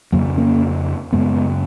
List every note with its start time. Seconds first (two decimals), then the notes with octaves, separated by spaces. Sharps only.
0.12 F2 C#3 F#3 A#3
0.37 A#3 C#4
1.12 F#2 C#3 G#3 B3